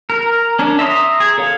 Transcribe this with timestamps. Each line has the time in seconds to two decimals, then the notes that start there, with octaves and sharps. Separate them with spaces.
0.10 A#4
0.59 C#4 D4
0.79 E5 A#5 C6 D#6
1.20 G#4
1.38 A4 C#5 F5